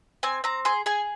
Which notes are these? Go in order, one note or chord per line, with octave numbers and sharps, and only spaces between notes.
C4 G#5
C4 A#5
G#4 C6
G#4 G#5